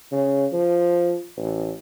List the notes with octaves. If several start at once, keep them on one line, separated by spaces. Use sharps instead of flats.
C#3
F3
A1